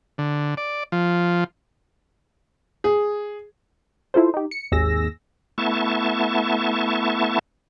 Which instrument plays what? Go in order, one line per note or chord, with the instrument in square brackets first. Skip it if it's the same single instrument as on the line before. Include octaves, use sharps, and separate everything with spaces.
[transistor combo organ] D3
D5
F3
[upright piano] G#4
[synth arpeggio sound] E4 F4 A4 C5
D#4 G4
C#7
G#1 D#2 G#4 E6 A#6
[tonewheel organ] A3 B3 E4 A5 C#6